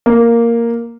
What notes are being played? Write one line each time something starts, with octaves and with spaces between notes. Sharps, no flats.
A#3